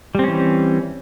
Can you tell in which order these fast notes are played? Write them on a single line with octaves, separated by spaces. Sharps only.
G3 C4 C#4 E3